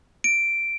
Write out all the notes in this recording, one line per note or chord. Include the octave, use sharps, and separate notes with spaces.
D7